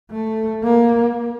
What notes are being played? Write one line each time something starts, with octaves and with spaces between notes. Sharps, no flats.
A3
A#3